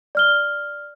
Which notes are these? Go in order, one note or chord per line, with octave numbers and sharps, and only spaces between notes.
D5 F6 G7